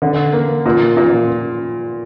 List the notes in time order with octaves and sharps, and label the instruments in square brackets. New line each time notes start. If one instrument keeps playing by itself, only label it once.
[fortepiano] D3
A#3
A#2
A#2